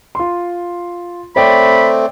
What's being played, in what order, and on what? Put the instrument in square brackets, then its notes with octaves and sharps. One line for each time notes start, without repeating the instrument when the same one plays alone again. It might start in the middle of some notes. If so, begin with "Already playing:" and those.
[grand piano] F4 C6
[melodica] A3 C4 [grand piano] C#5 D5 G5 [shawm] B5